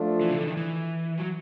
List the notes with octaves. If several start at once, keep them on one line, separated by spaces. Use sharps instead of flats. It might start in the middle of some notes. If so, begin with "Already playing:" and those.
Already playing: F3 A3 D4 F4 A4
E3
C#3
D3
D#3
E3
F#3